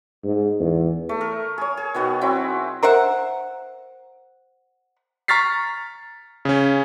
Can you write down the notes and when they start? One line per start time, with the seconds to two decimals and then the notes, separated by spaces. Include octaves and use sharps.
0.24 G#2
0.59 E2
1.09 A3
1.21 A#4 C#6
1.58 G#4 C#5
1.77 G#4
1.94 B2 D#3 B3 F#4
2.21 F#3 C4 E4 B5
2.83 A#4 C5 E5 F#5
5.28 A#5 C#6 F6 A6 B6 C7
6.45 C#3 C#4